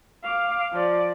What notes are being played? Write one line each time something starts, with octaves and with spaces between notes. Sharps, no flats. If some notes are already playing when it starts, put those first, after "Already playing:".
F5 D6
F3 D5